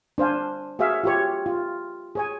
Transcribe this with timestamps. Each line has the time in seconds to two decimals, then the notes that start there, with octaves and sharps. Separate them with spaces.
0.18 D4 C5 F5 G#5
0.79 F#4 G#4 C#5 E5 F5
1.04 F4 G4 C#5
1.46 F4
2.15 G#4 C#5 G#5